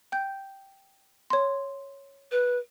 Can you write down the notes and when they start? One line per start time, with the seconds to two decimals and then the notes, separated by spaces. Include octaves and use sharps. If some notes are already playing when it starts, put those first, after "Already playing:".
0.12 G5 G6
1.30 C#5 C6
2.31 B4